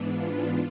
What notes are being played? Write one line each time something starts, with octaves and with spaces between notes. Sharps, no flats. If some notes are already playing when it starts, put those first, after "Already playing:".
Already playing: G#2 E3 B3 D4
F4